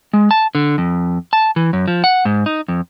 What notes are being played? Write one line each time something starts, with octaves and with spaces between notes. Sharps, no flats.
G#3
A5
D3
F2
A5
E3
F#2
F3
F#5
G#2
D#4
F2